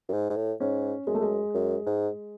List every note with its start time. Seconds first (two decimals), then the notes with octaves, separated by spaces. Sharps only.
0.09 F#2
0.13 G#2
0.30 G#2
0.36 A2
0.60 G#2 C#4
1.07 F#2 G#3
1.14 A3
1.21 G#3
1.54 F#2
1.86 G#2